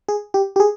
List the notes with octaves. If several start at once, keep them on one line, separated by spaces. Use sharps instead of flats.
G#4
G4
G4
G#4